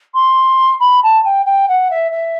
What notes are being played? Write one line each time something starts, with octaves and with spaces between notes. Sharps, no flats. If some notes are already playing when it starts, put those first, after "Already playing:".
C6
B5
A5
G5
G5
F#5
E5
E5